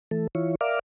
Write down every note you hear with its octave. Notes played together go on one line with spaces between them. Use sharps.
E3 A3 A4
E3 E4 F4 C#5
A#4 D5 E5 F5 D6 F6